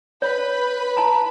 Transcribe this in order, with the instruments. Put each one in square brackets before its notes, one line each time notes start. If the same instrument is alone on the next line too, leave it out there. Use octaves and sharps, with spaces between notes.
[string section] B4 B5 [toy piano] C#5
[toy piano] A5 A#5